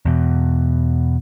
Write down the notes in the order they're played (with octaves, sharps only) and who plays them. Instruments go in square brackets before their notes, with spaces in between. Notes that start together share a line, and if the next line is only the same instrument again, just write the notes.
[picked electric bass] E2 B2